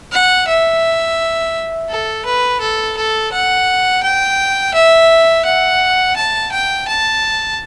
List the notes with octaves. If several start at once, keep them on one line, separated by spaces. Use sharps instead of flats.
F#5
E5
A4
B4
A4
A4
F#5
G5
E5
F#5
A5
G5
A5